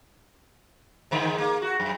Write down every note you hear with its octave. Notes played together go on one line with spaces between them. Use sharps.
G#2 D3 D#3
A#3
F#4
F#2